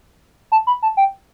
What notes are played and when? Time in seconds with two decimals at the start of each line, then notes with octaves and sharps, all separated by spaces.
0.52 A5
0.67 B5
0.83 A5
0.97 G5